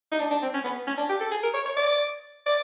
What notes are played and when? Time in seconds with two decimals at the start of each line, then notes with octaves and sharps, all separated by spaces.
0.11 D#4
0.19 D4
0.30 D4
0.42 C4
0.54 C#4
0.64 B3
0.87 C#4
0.97 D4
1.09 G4
1.20 A4
1.31 G#4
1.43 A#4
1.54 C#5
1.66 C#5
1.77 D5
2.46 D5